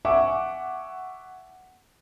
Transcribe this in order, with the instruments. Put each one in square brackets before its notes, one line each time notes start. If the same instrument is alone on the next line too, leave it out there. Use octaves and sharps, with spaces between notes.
[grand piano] E5 F#5 G#5 C#6 D6